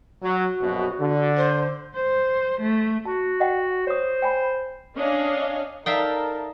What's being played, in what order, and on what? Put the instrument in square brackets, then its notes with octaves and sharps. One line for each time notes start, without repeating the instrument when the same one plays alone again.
[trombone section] F#3 [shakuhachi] F#4
[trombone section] A#1 F#2 B2
D3
[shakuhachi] C5
[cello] C5
A3
[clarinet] F#4 [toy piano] A5
[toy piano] D#5 F#5 G5
[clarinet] C5 [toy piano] C#5 D#6
[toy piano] G5 G#5 B5
[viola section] C#4 D4 C#5 D#5 F5
[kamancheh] D#4 A4 [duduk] A#4 [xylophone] D5 D#6 [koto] E5 F5 G5